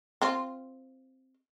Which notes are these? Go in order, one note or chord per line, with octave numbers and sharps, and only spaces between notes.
C4 F4